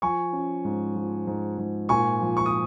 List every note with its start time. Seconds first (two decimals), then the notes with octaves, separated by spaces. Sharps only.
0.02 F3 G#5 C#6
0.33 C#4
0.65 G#2
0.96 F3
1.27 G#2
1.58 G#2
1.89 A#2 G#5 C#6
2.21 F3
2.37 C#6
2.46 D#6